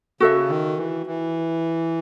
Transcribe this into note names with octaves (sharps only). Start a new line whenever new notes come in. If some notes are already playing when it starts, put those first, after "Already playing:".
C#3 F#4 A4 E5
D#3
E3
E3